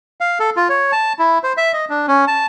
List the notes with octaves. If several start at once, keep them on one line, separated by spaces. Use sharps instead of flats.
F5
A4
F4
C#5
A5
E4
C5
E5
D#5
D4
C#4
A5